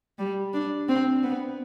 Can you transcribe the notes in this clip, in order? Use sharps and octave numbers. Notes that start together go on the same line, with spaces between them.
G3
D4
C4
B3